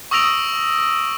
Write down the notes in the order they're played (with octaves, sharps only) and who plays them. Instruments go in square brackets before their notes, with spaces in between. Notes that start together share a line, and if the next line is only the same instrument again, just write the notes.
[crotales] C#6 D#6 E6 A#6 D7 F7